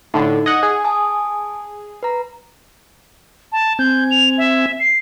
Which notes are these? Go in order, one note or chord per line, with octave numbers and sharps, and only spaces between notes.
A2 D3 D#4
D#5 F#5 G#6
G#4
G#5 A5 D#6
B4 A#5
A5
C4 G#5 G6
F7
E5
C7